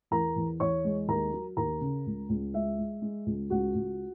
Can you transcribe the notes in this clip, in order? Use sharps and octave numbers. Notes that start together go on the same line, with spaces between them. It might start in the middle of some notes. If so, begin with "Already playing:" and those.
E2 A#4 A#5
E2
E2 C#5 C#6
G#3
D#2 A#4 A#5
F#3
D#2 A#4 A#5
C#3
C#2
C#2
G#3 E5
G#3
G#3
C#2
C#2 F#4 F#5
C#2